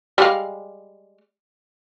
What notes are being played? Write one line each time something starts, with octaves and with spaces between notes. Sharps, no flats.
G3 G#3 F5